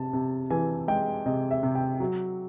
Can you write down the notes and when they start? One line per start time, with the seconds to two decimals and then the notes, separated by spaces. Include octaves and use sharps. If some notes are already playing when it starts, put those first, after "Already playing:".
Already playing: C3 A5
0.13 C3
0.50 E3 G#5
0.88 G#3 G5
1.26 C3 D#5
1.51 E5
1.63 C3
1.75 G5
2.00 F#3